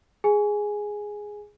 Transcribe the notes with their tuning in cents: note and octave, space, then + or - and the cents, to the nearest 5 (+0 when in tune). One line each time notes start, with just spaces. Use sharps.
G#4 +0 G#5 +5